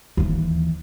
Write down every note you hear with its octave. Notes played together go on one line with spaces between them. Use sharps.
D#2 E3